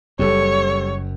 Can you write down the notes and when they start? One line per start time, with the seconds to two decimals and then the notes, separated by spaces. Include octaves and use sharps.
0.19 F#1 F#2 G3 A4 C#5